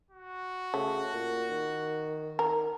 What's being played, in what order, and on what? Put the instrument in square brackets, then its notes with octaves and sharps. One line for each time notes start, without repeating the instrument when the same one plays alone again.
[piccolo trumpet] F#4
[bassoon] C#3 [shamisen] A3
[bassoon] A#2
D#3
[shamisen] A#4